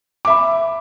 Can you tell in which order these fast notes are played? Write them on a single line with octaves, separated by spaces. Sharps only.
D6 E5 B5